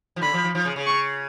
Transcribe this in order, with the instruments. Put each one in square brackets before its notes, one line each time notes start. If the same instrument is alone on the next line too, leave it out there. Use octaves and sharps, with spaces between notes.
[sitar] F3
[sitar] D3 [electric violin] B5
[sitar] F3
F3
F3
C#3
C#3
[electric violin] C#6